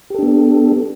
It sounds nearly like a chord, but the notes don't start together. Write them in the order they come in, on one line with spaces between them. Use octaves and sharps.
G4 A4 D4 B3